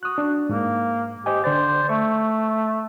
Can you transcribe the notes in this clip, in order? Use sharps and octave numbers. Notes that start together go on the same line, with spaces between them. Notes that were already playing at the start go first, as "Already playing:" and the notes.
F#4 D#6 F#6
D4
G#2 A#3
G4 C5 D#5 G#5
D3 C5 D5 A6
A3 C#6